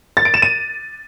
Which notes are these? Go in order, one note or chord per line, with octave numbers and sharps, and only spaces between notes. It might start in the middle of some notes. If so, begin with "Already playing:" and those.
A6
D7
E7
D#7